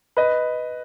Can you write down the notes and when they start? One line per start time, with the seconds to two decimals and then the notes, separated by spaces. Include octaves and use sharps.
0.17 B4 D#5